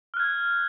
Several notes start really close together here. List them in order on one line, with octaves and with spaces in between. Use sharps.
F6 F#6 G#6